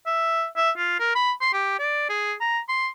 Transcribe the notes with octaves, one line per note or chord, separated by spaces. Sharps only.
E5
E5
F4
A#4
B5
C6
G4
D5
G#4
A#5
C6